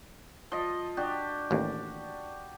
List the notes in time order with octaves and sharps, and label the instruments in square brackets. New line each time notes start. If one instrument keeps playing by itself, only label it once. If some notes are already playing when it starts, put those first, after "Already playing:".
[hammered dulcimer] F3 D#5
D4 F#4 G4
[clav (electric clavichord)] A1 D#2